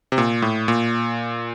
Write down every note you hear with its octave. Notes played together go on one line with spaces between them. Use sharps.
C3
A#2
A2
A#2